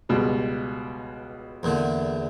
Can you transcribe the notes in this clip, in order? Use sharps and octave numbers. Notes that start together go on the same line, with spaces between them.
C#2 B2 G3
E2 A#2 D3